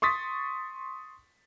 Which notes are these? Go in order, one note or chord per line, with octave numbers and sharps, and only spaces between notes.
C6 C#6 D#6 A6 B6